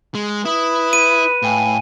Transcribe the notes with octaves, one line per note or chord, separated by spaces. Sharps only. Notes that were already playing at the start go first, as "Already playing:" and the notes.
G#3
E4 B4 D#6
D#7
A2 F5 G5 G#5